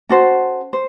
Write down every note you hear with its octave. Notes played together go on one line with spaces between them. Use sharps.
C#4 F#4 A4 C5
C5